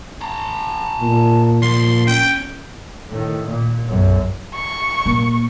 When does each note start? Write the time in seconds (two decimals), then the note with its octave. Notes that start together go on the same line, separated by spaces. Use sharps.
0.21 A5 A#5
1.00 A#2
1.62 A#2 F3 C6
2.07 C#4 G5
3.10 A2 D#3
3.47 A#2
3.88 B1 F#2
4.54 C#6
5.05 A#2 A#3